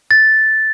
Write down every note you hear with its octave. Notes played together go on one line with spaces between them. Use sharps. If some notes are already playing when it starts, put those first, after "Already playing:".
A6